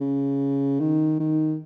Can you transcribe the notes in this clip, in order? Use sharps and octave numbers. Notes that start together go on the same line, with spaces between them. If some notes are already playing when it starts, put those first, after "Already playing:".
C#3
D#3
D#3